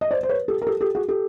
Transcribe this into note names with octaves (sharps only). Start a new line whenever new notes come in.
D#5
C5 D5
C5
B4 C#5
G4 A4
A#4
G4 A4
G4 A4
F#4 G#4
G4 A4